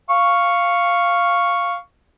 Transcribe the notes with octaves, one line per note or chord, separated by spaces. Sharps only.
F5 C#6